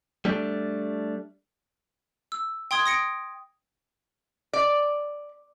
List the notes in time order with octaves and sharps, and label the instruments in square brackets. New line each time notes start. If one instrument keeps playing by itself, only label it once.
[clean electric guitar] G3 A3 D4
[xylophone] E6
G5 C6 D#6 G#6
D#6 A#6 C#7 D7
[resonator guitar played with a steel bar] D5